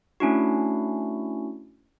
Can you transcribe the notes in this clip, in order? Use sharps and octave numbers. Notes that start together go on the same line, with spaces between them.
A3 C#4 D4 E4 F#4